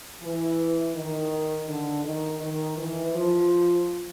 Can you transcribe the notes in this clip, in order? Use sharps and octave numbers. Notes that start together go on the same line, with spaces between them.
E3
D#3
D3
D#3
D#3
E3
F3